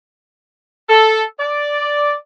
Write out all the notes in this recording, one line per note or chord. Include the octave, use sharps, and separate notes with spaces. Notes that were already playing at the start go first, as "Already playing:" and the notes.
A4
D5